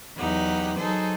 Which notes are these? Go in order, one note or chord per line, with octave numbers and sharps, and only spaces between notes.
E2 F#3 D#4 G4 F#5
F#3 D#4 G#4 A4 C5